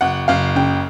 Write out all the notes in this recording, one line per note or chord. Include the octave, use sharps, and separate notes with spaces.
F#1 F#5
F#1 F5
C#3 G5